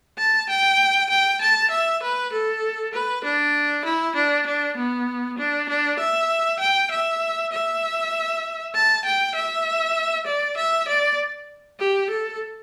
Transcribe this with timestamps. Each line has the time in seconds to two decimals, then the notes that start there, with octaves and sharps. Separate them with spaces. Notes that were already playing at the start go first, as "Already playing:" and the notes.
0.18 A5
0.49 G5
1.10 G5
1.41 A5
1.71 E5
2.02 B4
2.32 A4
2.93 B4
3.24 D4
3.84 E4
4.15 D4
4.46 D4
4.76 B3
5.38 D4
5.69 D4
5.99 E5
6.59 G5
6.91 E5
7.52 E5
8.75 A5
9.05 G5
9.35 E5
10.26 D5
10.57 E5
10.88 D5
11.79 G4
12.10 A4